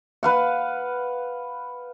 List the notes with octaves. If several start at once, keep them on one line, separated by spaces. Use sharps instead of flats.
B4 F5 F#5